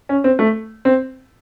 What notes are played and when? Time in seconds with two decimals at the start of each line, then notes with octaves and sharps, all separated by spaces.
0.09 C#4
0.24 C4
0.39 A3
0.85 C4